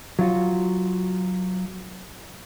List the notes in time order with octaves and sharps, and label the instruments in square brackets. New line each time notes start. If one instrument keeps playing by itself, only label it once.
[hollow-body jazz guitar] F#3 F4 F#4